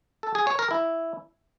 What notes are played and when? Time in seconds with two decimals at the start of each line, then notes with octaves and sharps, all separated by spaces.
0.23 A4
0.35 G#4
0.47 C#5
0.59 A#4
0.71 E4